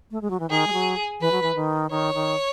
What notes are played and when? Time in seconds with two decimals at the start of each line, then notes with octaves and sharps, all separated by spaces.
0.11 A3
0.22 G#3
0.30 F#3
0.40 E3
0.50 D#3 G#4
0.67 G#3
0.73 F#3
1.20 E3 B4
1.32 F#3
1.43 E3
1.55 D#3
1.91 D#3 C#5
2.14 D#3